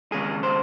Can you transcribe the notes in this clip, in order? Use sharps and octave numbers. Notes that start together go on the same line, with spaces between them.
D#2 C#3 G#3 G#4
C5